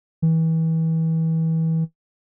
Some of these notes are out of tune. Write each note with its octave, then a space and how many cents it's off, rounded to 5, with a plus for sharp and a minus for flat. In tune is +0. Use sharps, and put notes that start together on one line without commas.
E3 -30